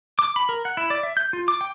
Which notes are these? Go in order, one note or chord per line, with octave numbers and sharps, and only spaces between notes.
D6
B5
A#4
F#5
E4
D5
E5
G6
F4
D6
G5